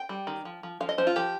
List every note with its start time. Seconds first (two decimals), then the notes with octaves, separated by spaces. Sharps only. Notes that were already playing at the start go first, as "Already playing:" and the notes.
Already playing: G5
0.09 G3
0.27 D#3
0.45 F3
0.63 F3
0.80 F3 F5
0.89 D#5
0.98 F3 C5
1.07 F4
1.16 F3 G4